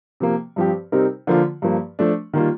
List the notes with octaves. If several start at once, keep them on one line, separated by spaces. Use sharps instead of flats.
C3 F3 A#3
G2 F3 C4 G4
C3 G3 C4 D#4 A#4
D3 F3 A#3 F4
G2 F3 A#3
F3 A3 D4
D#3 G3 A#3 F4